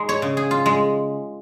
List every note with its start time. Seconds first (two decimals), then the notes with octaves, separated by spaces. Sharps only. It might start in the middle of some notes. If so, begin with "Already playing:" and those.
Already playing: G#3 D#4
0.09 C#5
0.22 C#3
0.37 G#4
0.51 F4
0.66 G#3